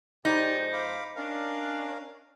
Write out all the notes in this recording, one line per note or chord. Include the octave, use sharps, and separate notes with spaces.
F2 G#3 D#4 G4 C5 D5
F5 B5 D6
C#4 D4 A#4 F5